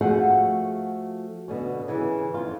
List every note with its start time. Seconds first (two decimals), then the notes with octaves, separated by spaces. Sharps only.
0.01 F3 A3 F#4 G#4 F5 F#5
1.48 B2 D3 C#4
1.88 C#3 E3
2.34 F2 F4